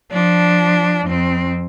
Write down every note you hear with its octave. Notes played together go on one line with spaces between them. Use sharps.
F3 D4
F2 C4